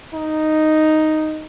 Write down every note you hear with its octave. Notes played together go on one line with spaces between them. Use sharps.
D#4